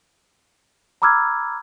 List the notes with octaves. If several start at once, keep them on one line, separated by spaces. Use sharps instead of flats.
A#5 B5 D6 E6 F6 G#6